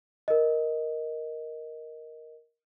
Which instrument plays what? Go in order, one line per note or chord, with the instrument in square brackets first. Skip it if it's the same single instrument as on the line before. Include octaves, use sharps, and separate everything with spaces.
[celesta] A#4 D#5